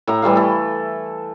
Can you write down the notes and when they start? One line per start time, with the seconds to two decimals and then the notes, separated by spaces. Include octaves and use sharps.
0.07 A2 E5 A#5
0.22 E3 G3 A3 F5
0.35 E4 A4